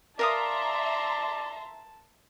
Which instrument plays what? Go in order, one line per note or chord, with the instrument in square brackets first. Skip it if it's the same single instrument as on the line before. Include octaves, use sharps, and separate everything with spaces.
[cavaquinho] A#4 F5 D#6 [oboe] D5 [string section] E5 A#5 C6 [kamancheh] A5